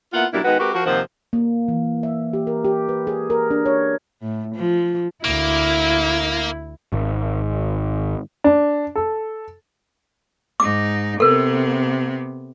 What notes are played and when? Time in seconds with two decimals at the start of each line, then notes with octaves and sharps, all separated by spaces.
0.14 A#3 B3 E4 F4 F#5
0.32 B2 F#3 G3 A#3 D4 E4
0.44 D#3 G#3 B3 D#4 F#4 B4
0.59 G#3 C4 F#4 G4 A#4 B4
0.73 F3 F#4 A#4
0.85 D#2 C3 D#3 F3 C5 F#5
1.33 A#3
1.68 E3
2.03 E5
2.33 G4
2.47 A#4
2.65 G4
2.89 B4
3.07 G#4
3.30 A#4
3.51 D4
3.66 C#5
4.22 A2
4.55 F3
5.24 D2 A#3 E4
6.92 G#1
8.44 D4
8.96 A4
10.60 G#2 D#4 D6
11.20 C3 B3 A4 A#4